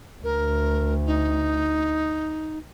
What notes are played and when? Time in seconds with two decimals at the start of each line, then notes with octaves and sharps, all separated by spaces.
0.24 D2 A#4
1.06 D#4